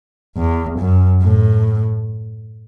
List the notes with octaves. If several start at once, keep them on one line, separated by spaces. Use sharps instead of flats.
E2
F#2
A2